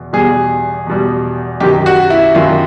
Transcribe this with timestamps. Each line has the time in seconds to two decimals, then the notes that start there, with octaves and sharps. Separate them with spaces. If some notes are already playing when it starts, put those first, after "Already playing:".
Already playing: E2 B2
0.13 E2 B2 G3 G#4
0.87 E2 B2 G3
1.60 F#2 D#3 F#3 G4
1.86 F#4
2.10 E4
2.35 F#2 D#3 F#3 F4